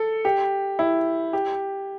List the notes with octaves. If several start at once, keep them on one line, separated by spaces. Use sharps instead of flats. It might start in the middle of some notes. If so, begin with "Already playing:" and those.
Already playing: A4
G4
E4
G4